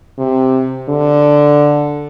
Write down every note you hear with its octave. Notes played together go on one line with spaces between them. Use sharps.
C3
D3